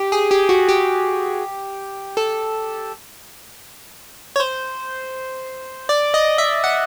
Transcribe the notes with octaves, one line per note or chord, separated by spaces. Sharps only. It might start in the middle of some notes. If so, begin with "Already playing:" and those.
Already playing: G4
G#4
G4
F#4
G4
A4
C#5
C5
D5
D#5
E5
F#5